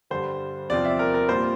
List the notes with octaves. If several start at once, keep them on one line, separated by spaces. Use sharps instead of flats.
G2 D3 G3 C5
E2 C3 F3 C4 F4 D5
E5
A#4
A#4
A#2 G3 C4 F4 C5